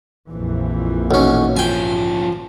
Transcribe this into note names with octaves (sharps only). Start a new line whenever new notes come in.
A#1 F2 E3
B1 C#4
F3 C#4 G5 G#5